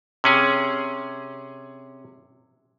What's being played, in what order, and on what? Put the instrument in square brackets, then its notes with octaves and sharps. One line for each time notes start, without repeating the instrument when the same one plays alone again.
[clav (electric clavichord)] C3 C#4 G#4